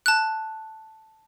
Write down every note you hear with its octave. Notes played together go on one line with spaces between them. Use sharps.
A5 F#6